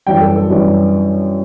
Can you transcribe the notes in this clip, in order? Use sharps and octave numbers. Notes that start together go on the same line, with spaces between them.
F#2 E3 G3 G5
A4
A4
F#2 E3 G3